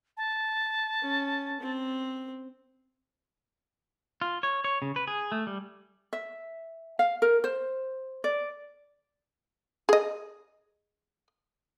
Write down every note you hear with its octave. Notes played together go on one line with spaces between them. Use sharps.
A5
C#4
C4
F4
C#5
C#5
C#3
B4
G#4
A3
G3
E5
F5
A#4
C5
D5
G#4 D#5